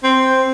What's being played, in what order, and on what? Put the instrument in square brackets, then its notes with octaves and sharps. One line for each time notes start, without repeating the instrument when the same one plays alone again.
[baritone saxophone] C4